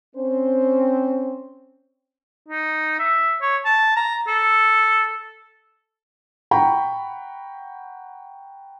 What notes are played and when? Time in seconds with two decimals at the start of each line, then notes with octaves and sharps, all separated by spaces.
0.16 C4 C#4 C5
2.48 D#4
2.99 E5
3.42 C#5
3.65 A5
3.96 A#5
4.27 A4
6.51 F#5 G5 A#5 B5 C#6